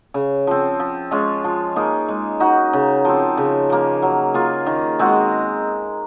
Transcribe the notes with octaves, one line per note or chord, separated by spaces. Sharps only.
C#3
F3 C4
F3
G#3 C#4 F4
F3
A#3 D#4 G#4
G#3
D#4 F#4
C#3
F3 C4
C#3
F3 A#3
F#3
A#3 F4 G#4
D#3
G#3 C4 F#4